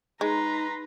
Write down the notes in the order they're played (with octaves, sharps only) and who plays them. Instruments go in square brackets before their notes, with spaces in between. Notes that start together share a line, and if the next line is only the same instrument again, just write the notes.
[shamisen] G#3 [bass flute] D#4 [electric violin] B4 C6 [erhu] A#5